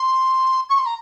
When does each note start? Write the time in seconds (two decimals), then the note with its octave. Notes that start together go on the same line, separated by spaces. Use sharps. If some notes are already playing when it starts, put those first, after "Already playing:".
Already playing: C6
0.70 C#6
0.78 C6
0.86 A#5